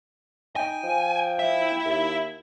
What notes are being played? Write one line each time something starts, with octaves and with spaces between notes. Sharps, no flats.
D#4 G5 G#5
F3
E4 E5
D#2